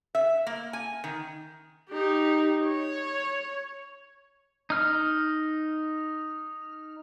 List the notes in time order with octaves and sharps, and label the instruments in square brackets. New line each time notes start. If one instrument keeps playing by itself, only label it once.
[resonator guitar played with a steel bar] E5
A#3
G#5
D#3
[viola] D#4 G4
C#5
[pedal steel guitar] D#4 F6